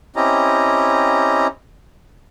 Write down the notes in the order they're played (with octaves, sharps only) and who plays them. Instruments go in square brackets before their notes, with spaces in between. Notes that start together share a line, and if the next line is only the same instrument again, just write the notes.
[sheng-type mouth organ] C4 C#4 E4 G4 D#5 A#5